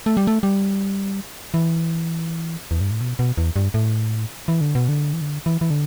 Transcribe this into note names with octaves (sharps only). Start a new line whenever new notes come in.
A3
G3
A3
G3
E3
E2
G2
A2
B2
B2
E2
G2
A2
E3
D3
B2
D3
E3
D3
E3
E3
D3